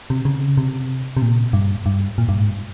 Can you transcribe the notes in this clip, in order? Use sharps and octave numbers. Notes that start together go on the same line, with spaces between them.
C3
C#3
C3
C3
A#2
G2
G2
A#2
G2
G#2